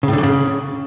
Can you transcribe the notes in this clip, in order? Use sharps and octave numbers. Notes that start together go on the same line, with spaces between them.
C#3
A2
D3
F#2
C#3